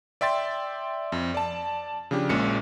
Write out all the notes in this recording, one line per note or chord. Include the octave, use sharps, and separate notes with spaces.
D5 E5 G5 C6 A6
F2
D5 A5
C#3 F3 D4 G4
A#1 A#2 G#3 C#4 C#7